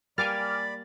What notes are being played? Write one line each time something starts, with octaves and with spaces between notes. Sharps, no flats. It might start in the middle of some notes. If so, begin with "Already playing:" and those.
G3 A#3 D5 G#5 B5 D6 F6 A6